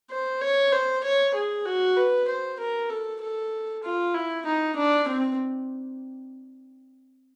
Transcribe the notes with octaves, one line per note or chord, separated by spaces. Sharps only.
C5
C#5
C5
C#5
G#4
F#4
B4
C5
A#4
A4
A4
F4
E4
D#4
D4
C4